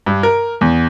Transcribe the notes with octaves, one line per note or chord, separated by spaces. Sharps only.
G2
A#4
E2